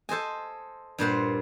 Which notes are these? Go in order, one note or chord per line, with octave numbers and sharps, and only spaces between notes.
A4 C5 D#5 G#5
G2 A#2 C5 F#5